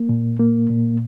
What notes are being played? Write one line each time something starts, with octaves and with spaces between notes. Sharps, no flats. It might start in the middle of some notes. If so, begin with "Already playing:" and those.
Already playing: A#3
A#2
A#3
A#2